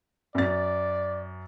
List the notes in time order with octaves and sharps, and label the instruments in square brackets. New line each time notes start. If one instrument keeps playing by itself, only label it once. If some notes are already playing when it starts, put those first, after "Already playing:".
[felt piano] F#2 A6 [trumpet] D5